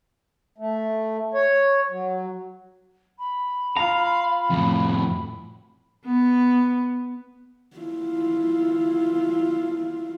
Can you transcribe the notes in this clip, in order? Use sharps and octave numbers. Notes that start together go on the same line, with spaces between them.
A3
C#5
F#3
B5
F4 F5 A#5
F2 A2
B3
E4 F4